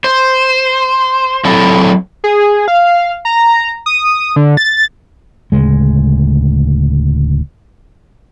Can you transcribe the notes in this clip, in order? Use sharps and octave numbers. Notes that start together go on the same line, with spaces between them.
C5
F#3 C4 E4 A4
G#4
F5
A#5
D#6
D3
A6
D1 D2 C#3 G#3